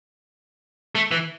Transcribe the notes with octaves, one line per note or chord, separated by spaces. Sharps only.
A3
E3